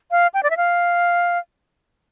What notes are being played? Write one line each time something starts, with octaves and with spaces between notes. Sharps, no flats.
F5
G5
D5
E5
F5